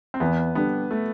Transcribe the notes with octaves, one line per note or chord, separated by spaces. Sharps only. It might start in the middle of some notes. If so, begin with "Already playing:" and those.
C4
E2 B3
D3 G3 B3 D4
A3